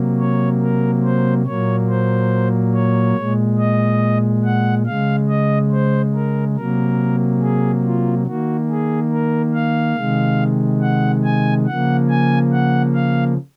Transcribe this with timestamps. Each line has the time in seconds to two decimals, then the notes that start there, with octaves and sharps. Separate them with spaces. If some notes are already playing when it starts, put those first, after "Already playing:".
Already playing: C3 F#3 A#3
0.19 C#5
0.61 A#4
1.04 C5
1.46 A#2 F#3 A#3 C#5
1.89 C5
2.74 C#5
3.17 A#2 G#3
3.59 D#5
4.45 F#5
4.86 C#3 G#3 F5
5.29 D#5
5.72 C5
6.14 A#4
6.56 C3 F#3 A#3 A#4
7.42 G#4
7.84 F4
8.27 D#3 A#3 F#4
8.70 G#4
9.12 A#4
9.54 F5
9.97 C3 D#3 G#3
10.82 F#5
11.25 G#5
11.67 C#3 F3 A#3 F#5
12.09 G#5
12.52 F#5
12.94 F5